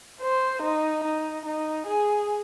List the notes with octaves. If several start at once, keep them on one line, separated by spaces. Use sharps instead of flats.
C5
D#4
D#4
D#4
G#4